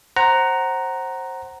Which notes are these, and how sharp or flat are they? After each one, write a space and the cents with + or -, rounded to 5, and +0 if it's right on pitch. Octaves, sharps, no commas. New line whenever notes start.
C5 +20 F#5 +20 A#5 +0